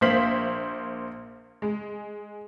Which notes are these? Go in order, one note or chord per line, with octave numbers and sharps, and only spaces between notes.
A#1 A#3 C5 F5 B6 F#7
G#3